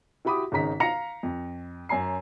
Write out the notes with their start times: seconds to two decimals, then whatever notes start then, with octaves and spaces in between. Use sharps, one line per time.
0.25 E4 F#4 G4 B5 D6 D#6
0.52 G#1 C#3 D#4 A#5 B6
0.80 F5 A#5 A#6 C#7 F7
1.23 F2
1.89 F#2 C#4 G#5 A#5 C7